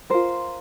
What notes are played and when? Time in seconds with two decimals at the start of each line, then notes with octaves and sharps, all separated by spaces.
0.10 F4 A#4 C5